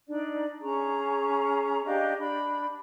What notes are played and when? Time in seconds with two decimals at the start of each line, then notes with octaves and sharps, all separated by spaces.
0.08 D4 D#4 D5
0.62 C#4 G#4 A#5 C#6
1.84 D4 G4 D#5 F5
2.18 D4 B5